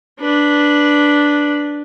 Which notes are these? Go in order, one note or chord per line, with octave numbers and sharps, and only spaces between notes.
D4 B4